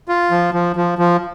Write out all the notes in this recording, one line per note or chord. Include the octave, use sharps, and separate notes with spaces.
F4
F3
F3
F3
F3